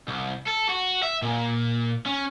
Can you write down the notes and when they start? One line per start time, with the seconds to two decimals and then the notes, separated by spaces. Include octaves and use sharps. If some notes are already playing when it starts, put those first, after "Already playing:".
0.08 C2
0.48 A4
0.70 F#4
1.03 E5
1.22 A#2
2.06 C#4